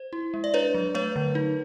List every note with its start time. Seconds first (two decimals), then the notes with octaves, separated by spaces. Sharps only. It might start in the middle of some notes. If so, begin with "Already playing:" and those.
Already playing: C5
0.13 E4
0.34 G#3
0.44 D5
0.54 D4 B4 C#5
0.74 F#3
0.95 A3 B4 C#5
1.16 D3
1.35 D#4